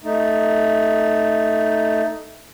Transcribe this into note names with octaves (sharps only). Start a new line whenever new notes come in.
A3 D#4